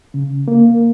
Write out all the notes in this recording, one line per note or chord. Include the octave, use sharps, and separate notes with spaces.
C#3
A#3